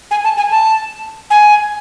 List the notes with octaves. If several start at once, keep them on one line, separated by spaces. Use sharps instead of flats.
G#5
A5
G#5
A5
G#5